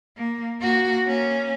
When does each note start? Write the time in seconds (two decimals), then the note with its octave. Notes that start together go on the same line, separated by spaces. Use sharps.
0.17 A#3
0.60 A#3 F#4
1.07 A#3 C#4